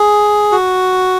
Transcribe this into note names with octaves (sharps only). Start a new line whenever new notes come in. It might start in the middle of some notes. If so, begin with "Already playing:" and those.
Already playing: G#4
F#4